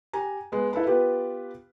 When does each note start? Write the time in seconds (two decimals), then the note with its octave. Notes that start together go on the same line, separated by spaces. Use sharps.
0.13 G4 G#5 A#5
0.52 G#3 B3
0.73 E4 A4 B4 B5
0.87 B3 F4 G4 B4